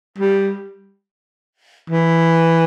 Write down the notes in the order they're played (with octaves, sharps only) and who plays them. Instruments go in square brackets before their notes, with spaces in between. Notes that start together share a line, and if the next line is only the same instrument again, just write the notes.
[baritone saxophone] G3
E3